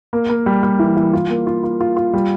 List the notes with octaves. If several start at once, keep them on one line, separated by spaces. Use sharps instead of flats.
A#3
A#3
G3
G3
E3
E3
F4
A#3
F4
F4
F4
F4
G3